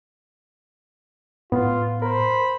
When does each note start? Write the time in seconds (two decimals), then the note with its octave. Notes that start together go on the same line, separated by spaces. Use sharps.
1.52 A2 B3 F4
2.02 A#4 C5 B5